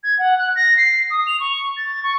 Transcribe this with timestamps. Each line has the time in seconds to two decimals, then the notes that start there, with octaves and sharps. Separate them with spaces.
0.03 G#6
0.19 F#5
0.38 F#6
0.56 A#6
0.77 C7
1.10 D#6
1.27 F7
1.40 C#6
1.77 A6
2.03 C#6